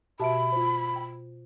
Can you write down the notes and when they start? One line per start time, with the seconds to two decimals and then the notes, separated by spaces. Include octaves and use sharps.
0.20 B2 F#4 G4 E5 A5 B5 D7
0.52 F4 C5
0.96 G5